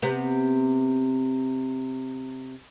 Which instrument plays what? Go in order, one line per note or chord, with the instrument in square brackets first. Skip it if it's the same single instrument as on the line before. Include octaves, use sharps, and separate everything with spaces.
[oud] C3 B3